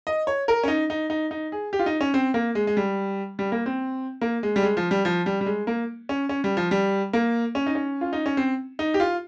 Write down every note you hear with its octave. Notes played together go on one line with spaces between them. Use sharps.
D#5
C#5
A#4
C#4
D#4
D#4
D#4
D#4
G#4
G4
F4
D#4
C#4
C4
A#3
G#3
G#3
G3
G3
A#3
C4
A#3
G#3
G3
G#3
F3
G3
F3
G3
G3
G#3
A#3
C#4
C#4
G3
F3
G3
A#3
C#4
D#4
C#4
F4
D#4
C#4
C4
D#4
G4
F4